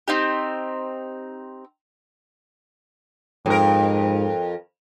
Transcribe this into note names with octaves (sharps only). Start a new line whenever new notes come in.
C4 D#4 G4
F2 G#2 A#4